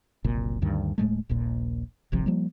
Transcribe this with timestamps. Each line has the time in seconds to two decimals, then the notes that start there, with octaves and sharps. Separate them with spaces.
0.24 F#1 C2 A#2
0.62 D2 G2 D#3
0.98 D1 A2 G#3 A3
1.29 D#1 A#1 A#2
2.12 D1 G#1 C3 F3
2.26 F3 G3 A#3